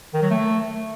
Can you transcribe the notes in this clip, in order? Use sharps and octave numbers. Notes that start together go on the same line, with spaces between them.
D#3
F#3
A3